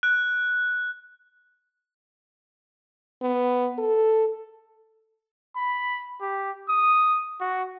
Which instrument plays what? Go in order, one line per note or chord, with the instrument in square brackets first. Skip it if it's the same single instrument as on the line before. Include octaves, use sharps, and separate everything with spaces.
[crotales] F#6
[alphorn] B3
A4
[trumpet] B5
G4
D#6
F#4